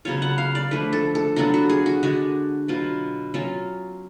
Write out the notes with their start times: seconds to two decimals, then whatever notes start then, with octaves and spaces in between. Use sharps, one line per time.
0.05 C#3 F#3 B3 F4 C#5
0.22 F#5
0.38 F5
0.55 D5
0.71 D3 F3 A3 D4 B4
0.93 A4
1.15 A4
1.36 F#3 B3 D4 F4 F#4
1.54 F#4
1.70 G#4
1.86 F#4
2.03 D3 G#3 D4 F#4
2.68 B2 F#3 B3 F4
3.34 F#3 C#4 F4